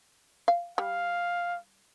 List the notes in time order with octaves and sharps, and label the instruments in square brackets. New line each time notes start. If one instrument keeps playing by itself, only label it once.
[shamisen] F5
[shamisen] G3 [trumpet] F5